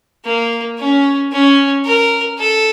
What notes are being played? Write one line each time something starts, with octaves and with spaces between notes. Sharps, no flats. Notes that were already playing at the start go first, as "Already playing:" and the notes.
A#3
C#4
C#4
A#4
A4